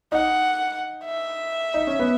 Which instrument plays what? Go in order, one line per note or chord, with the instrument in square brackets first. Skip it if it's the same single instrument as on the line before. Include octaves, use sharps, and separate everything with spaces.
[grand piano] D#4 [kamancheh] F#5
[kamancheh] E5
[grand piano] D#4
C#4
B3